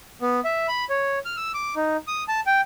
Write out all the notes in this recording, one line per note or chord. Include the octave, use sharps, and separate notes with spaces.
B3
E5
B5
C#5
F6
E6
D6
D#4
D#6
A5
G5